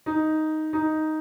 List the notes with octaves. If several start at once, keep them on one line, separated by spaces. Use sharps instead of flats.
D#4
D#4